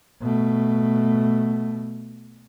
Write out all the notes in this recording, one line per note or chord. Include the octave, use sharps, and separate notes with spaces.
B2 A3